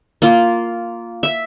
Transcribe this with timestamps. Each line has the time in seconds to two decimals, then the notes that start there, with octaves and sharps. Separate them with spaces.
0.22 A#3 F4
1.23 E5